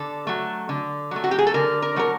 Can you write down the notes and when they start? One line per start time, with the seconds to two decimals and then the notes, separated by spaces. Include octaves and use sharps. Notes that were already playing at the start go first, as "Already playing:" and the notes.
Already playing: D3 A4
0.27 F#3 A3
0.69 D3
1.11 F#3 A3
1.24 F#4
1.31 G4
1.38 G#4
1.47 A4
1.54 D3 A#4
1.82 A#4
1.96 F#3 A3 A#4